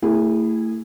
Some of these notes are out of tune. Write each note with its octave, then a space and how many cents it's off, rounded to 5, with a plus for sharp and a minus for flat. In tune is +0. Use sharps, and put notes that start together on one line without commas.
A3 +35 E4 +5 G#4 -25